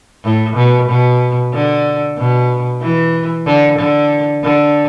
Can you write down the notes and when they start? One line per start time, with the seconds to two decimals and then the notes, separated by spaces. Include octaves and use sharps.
0.24 A2
0.57 B2
0.89 B2
1.54 D3
2.18 B2
2.81 E3
3.46 D3
3.79 D3
4.43 D3